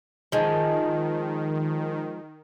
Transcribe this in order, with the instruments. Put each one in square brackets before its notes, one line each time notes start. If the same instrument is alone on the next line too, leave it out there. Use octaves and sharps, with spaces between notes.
[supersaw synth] D#3 [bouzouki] F3 G#3